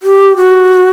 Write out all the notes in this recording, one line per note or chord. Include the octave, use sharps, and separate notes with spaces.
G4
F#4